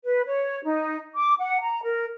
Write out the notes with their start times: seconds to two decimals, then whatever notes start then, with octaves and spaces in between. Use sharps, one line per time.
0.05 B4
0.26 C#5
0.65 D#4
1.15 D6
1.39 F#5
1.62 A#5
1.84 A#4